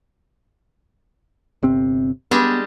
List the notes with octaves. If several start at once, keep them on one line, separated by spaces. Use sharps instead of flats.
G1 C3 C4
G3 G#3 B3 D4